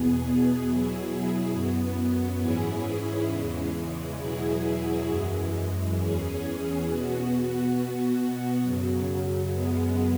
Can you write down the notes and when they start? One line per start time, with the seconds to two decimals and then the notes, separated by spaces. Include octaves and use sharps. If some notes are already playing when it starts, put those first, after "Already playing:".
Already playing: E2 B2 B3 G#4
0.61 B2 F#3 E4 G#4
1.50 F#2 F#3 B3
2.39 G#2 E3 C#4 E4 G#4
3.28 E2 C#3 E3 G#3
4.18 E2 B2 F#3 E4 G#4
5.06 F#2 E3 G#3
5.95 E2 E3 C#4 G#4
6.85 B2 B3 F#4
7.74 B2 B3 F#4
8.63 F#2 C#3 F#3
9.52 F#2 C#3 G#3 B3